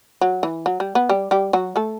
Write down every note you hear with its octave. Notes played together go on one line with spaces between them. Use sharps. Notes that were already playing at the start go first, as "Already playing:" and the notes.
F#3
E3
F#3
G3
B3
G3 G4
G3 G4
F#3 F#4
A3 A4